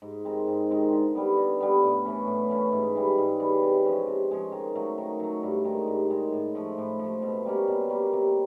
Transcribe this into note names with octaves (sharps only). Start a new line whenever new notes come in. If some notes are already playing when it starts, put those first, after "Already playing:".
G#2
D#3 G#3 C4
G#2
D#3 G#3 C4
D3
G3 B3
D3
G3 B3
A2
E3 A3 C#4
A2
E3 A3 C#4
G#2
E3 G3
G#2
E3 G3
C3
F3 G#3 C#4
C3
F3 G#3 C#4
D#3
F#3 A3
D#3
F#3 A3
G2
D#3 G#3
G2
D#3 G#3
A2
F3 A3
A2
F3 A3
B2
G3 A#3 C#4
B2
G3 A#3 C#4
C3